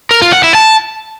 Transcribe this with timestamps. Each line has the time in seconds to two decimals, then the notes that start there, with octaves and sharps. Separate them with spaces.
0.11 A#4
0.22 F4
0.33 F#5
0.44 E4
0.55 A5